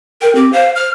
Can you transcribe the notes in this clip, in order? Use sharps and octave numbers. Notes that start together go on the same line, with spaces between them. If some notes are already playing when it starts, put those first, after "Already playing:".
A#4 G5
C4 G4
C5 F5
F6